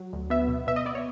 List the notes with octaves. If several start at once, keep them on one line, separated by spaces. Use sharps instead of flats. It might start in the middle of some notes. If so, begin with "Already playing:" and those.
Already playing: F#3
D2
B3 E5
B2
B2 E5
D#5
B3 D5
C#5